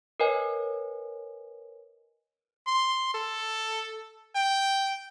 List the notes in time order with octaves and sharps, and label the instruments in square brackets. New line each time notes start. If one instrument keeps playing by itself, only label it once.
[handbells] A#4 B4 C#5 D#5 G#5
[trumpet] C6
A4
G5